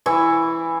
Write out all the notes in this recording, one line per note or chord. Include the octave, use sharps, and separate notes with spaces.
E3 E4 C#6